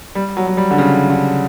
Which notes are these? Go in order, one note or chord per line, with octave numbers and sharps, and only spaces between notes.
G3
F#3
F#3
G3
D3
C#3
D3